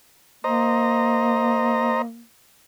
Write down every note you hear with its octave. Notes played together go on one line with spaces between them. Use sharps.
A#3 C5 D#5 A#5